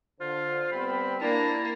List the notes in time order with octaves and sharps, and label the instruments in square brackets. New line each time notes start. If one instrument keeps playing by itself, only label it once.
[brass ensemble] D3 [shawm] F4 [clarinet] C5
[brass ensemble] G3 B3 C4 [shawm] B5
[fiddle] A#3 [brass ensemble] D4 [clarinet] E4 [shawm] A5